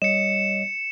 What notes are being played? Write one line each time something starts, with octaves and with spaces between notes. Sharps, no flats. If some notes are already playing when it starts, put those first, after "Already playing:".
G3 C#5 D#5 C#7 E7